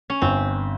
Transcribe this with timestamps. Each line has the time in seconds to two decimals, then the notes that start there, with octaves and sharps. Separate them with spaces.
0.10 C#4
0.22 G1 C4